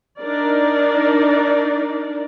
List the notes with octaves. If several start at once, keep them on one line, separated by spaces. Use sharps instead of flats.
D4 D#4 A#4 D5